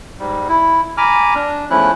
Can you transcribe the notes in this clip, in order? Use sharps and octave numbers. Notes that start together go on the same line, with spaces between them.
G#2 G3
E4
G#5 A#5 B5 D6 F6
D4
E2 F3 A3 C#4 E4 F#6